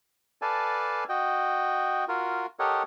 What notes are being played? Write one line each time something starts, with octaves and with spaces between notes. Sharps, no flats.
A4 B4 D5 F5 G#5 A5
F#4 D#5 G5
F4 F#4 A#4
G4 A4 A#4 C#5 D#5 F#5